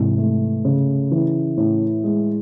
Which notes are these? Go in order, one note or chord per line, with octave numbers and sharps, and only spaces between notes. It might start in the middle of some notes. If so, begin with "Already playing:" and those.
Already playing: G#2 C3 E3
A3
C#3
E3
A2
G#3